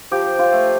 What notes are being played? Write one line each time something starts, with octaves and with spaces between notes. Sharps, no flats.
F3 G4
F4
A3